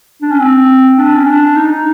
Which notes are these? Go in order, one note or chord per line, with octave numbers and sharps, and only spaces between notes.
D4
C#4
C4
D4
C#4
D4
D#4